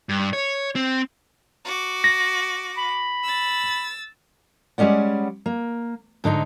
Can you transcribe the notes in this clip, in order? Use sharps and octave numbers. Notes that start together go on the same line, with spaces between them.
G2
C#5
C4
F#4 D6
A#6
B5
E6 A6
G3 G#3 C#4 D5 F#5
A#3
G#2 D3 D#4 A#5